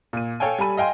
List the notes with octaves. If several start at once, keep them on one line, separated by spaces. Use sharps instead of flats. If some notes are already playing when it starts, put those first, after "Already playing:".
A#2 D#7
A4 C#5 F5 G5 G#5
G3 A4 G#5 B5 D#7
D#5 F5 G5 G#5 C6